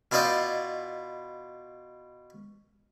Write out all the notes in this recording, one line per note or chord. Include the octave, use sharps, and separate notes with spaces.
B2 E4 F4 D5 D#5 G5